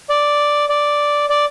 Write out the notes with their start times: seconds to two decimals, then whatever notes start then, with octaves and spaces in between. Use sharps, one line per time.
0.09 D5
0.69 D5
1.29 D5